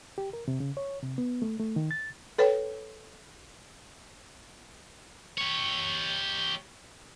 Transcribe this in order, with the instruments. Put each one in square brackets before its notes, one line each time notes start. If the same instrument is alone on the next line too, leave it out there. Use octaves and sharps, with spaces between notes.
[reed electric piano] G4
A#4
C3
C#3
C#5
C3
B3
A3
A3
D#3
A6
[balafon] A4 B4 C#5 G5
[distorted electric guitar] G4 C#5